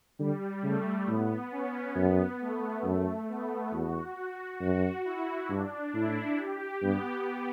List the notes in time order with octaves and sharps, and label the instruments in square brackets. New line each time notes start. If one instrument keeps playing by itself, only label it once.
[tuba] D3 [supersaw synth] G3
[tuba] C#3 [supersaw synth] A3
[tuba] A2 [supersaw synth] B3
[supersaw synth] C#4
[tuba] F#2 [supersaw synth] B3
[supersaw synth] A3
[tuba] F#2 [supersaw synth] A3
[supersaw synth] B3
[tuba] E2 [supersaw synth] F#4
[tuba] F#2 [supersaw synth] F#4
[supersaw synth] E4
[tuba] G2 [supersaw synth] D4
[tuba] A2 [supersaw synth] E4
[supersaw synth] G4
[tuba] G2 [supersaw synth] B3